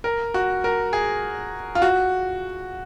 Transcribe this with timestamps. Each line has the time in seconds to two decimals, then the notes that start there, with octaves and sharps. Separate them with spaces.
0.04 A#4
0.34 F#4
0.64 A#4
0.93 G#4
1.75 F4
1.82 F#4